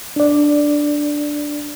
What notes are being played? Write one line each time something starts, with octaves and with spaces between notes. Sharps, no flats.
D4 D5